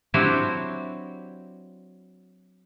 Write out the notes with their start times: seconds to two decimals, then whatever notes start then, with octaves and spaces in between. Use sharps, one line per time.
0.14 F#3 C4 D4 E4 F#4 G4